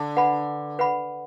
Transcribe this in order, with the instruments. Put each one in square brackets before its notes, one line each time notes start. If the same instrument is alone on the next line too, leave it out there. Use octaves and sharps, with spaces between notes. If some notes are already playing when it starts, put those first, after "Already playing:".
Already playing: [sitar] D3
[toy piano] B4 F#5 B5
B4 F#5 B5